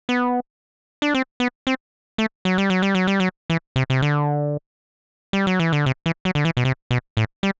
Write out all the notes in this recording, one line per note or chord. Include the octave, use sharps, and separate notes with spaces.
B3
D4
C4
B3
C4
A3
F#3
G3
F#3
G3
F#3
G3
F#3
E3
C3
C3
D3
G3
F#3
E3
D3
C3
E3
F#3
D3
E3
B2
C3
B2
A2
G3